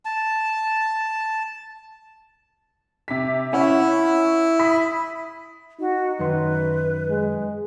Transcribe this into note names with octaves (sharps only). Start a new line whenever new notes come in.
A5
C3 B6
C#4 E4 C#5 F#5
B5 D#6 B6
D#4 F#4
F#2 D#3 B4 C6
G#3